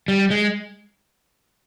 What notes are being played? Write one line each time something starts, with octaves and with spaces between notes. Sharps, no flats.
G3
G#3